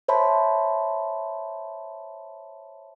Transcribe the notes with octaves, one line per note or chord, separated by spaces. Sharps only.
C5 C#5 E5 A5 B5 C6